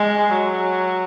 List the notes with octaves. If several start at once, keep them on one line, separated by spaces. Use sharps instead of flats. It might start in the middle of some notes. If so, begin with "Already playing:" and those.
Already playing: G#3
F#3